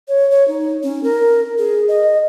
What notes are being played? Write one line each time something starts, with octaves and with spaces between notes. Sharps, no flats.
C#5
C#5
D#4
C#4
A#4
G#4
D#5